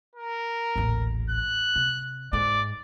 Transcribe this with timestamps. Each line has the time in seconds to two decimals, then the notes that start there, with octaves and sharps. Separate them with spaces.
0.16 A#4
0.76 D#1 A1
1.30 F#6
1.76 C3
2.33 G#2 D5